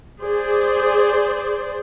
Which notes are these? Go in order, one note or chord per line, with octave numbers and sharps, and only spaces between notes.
G#4 C5 D5